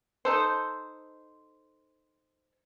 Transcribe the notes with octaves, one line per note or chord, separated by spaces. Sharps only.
D#4 A4 C5